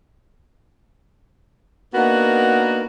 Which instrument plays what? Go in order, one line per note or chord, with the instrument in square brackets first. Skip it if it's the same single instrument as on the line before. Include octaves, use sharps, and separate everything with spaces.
[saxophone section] A#3 B3 D4 D#4 F#4 A#4